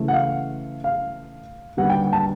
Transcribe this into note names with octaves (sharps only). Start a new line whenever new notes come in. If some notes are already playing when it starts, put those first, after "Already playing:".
Already playing: C#3 E3 A3
F#5
F5
F5
D#2 D3 G3 B3 F#5
G5
A5